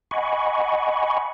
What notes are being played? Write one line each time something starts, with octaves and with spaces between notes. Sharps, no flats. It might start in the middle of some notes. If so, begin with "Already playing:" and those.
D#5 F#5 G#5 B5 C#6